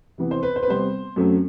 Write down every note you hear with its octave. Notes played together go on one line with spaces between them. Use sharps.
C3 E3 B3
C5
B4
C5
B4
C3 G3 B3 C5
F#2 F#3 A3 C4